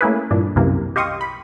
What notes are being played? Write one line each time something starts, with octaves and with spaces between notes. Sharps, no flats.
A3 A#3 C#4 E4 G#4 B4
G2 A#2 E3 D4
C2 F#2 C3 E3 A#3
G4 D#5 F5 C6 C#6 D#6
B5